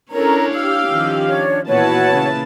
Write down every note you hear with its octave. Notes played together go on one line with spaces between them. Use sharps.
C#4 D4 E4 A4 A#4 C#5 A#5
G4 F5 E6
D#3 F3 C#4
D4 C#5
E2 A#2 E4 F#4 B4 C#5 A5
C#3 A#3